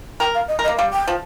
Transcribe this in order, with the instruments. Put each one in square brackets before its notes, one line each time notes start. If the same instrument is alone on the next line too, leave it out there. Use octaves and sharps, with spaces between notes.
[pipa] A#4 [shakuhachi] G5
[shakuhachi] F5
D#5
[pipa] A#4
[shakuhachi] D#5
[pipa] A#3
[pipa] G3 [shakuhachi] F5
[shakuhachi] G5
[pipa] F3